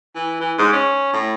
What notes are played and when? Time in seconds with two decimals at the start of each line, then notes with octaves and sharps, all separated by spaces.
0.15 E3
0.40 E3
0.58 G#2
0.73 C#4
1.14 A2